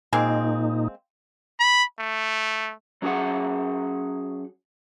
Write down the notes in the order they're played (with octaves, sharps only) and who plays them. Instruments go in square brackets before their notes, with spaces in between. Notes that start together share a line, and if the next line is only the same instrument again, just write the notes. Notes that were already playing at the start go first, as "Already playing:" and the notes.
[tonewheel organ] A#2 D#4 [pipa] G#3 A#3 C4
[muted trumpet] B5
A3
[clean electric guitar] F#3 C#4 F#4 G#4 E5 F#5